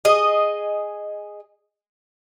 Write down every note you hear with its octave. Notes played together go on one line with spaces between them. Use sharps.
G#4 D#5